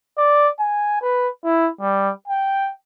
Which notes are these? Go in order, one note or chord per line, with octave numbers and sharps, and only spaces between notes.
D5
G#5
B4
E4
G3
G5